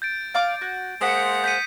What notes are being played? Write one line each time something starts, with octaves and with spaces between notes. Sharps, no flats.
G6 A6 D7
D5 F5 D6
F#4
G#3 A#3 C5 F#5 D#6 B6 C#7
C5 G6 B6 D#7